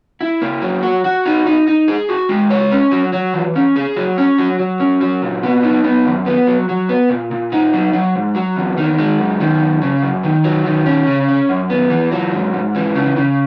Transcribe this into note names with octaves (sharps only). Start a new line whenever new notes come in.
E4
A#3
F#3
F#4
F#4
D#4
D#4
D#4
G#4
F#4
G#3
C#5
C#4
F#3
F#3
E3
C#4
G#4
F#3
C#4
F#3
F#3
C#4
F#3
A#2
B3
D#4
B3
F#2
B3
F#3
F#3
B3
A#2
A#2
D#4
F#3
F#3
G#2
F#3
E2
D#3
G#3
F#2
D#3
F#2
C#3
F#2
D#3
F#3
D#3
C#4
C#3
C#4
F#2
B3
E3
F#3
G#2
G#2
E3
C#3
C#3